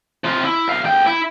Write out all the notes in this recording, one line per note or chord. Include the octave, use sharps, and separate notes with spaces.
C3 F4
E4
B1 F5
D2 G5
E4